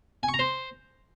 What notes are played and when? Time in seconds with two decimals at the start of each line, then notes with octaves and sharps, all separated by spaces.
0.23 G#5
0.28 C#6
0.34 A#5
0.39 C5